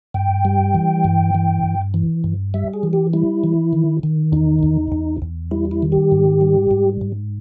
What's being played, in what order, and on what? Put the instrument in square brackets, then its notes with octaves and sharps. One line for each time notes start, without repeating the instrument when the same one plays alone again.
[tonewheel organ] G2 G5
G3
E3
G2
E3
G2
E3
G2
G3 E5
G#4
E3
G4
G3 E4
E3
D#3
D#3
E2 D#4
E2
E2
E2
G3 E4
E4
D#3
G4
G#2
G3
G#2
G#2